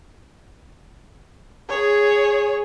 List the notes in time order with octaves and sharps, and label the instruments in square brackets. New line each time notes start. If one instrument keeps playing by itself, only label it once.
[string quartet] G#4 [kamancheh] C#5